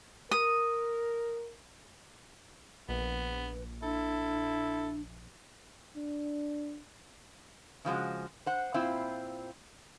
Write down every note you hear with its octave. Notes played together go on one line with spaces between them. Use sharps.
A#4 D#6
A#1 B3 B4
D4 E4 A4
D4
C#3 F3 G#3 F#4
C5 F#5
A#2 C4 E4 F4